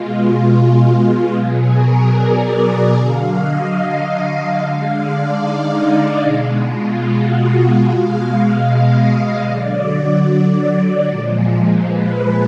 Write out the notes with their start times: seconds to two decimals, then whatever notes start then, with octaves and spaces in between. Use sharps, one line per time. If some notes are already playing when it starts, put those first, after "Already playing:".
Already playing: B2 G#3 F4
1.33 B2 F#3 G#4
1.74 A#4
2.14 D5
2.55 D5
2.95 D3 F#3 F5
3.36 D#5
3.76 F5
4.58 D3 G#3 F5
4.98 D5
5.38 D#4
5.78 D4
6.19 B2 G#3
6.60 F4
7.00 F#4
7.81 B2 G#3 F5
8.21 F5
8.62 D#5
9.43 D3 F#3 D5
11.05 A#2 F3 G#3
11.85 B4